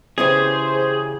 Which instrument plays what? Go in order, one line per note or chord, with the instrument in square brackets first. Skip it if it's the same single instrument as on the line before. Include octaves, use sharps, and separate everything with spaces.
[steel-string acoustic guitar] C#3 E3 G4 [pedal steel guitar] G#4 [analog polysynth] C5